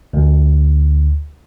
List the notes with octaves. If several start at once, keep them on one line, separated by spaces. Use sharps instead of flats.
D2